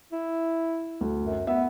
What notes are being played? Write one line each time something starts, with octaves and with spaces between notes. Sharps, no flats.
E4
D2
F#2
B3 E5